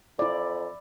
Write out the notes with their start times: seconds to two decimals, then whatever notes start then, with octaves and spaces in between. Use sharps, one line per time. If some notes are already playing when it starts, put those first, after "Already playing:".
0.19 F2 E4 D5